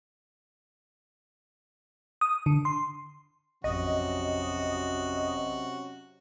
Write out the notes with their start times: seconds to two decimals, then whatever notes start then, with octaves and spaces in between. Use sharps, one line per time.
2.21 D#6
2.46 D3
2.65 C6
3.64 A1 F2 C3 F#3 C#4 F#4 D#5